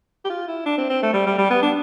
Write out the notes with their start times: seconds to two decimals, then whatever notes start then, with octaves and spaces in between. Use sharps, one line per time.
0.25 G4
0.30 F4
0.48 E4
0.66 D4
0.78 C4
0.90 C4
1.03 A3
1.14 G3
1.26 G3
1.38 G3
1.50 B3
1.62 D4